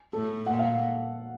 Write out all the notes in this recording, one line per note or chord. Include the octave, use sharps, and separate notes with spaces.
A2 A4
A#2 F#5
F5